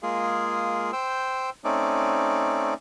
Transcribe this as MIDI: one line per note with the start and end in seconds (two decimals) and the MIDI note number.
0.03 0.91 56
0.03 0.91 58
0.03 0.91 65
0.03 0.91 68
0.93 1.50 72
0.93 1.50 79
0.93 1.50 88
1.64 2.74 57
1.64 2.74 60
1.64 2.74 61
1.64 2.74 63
1.64 2.74 74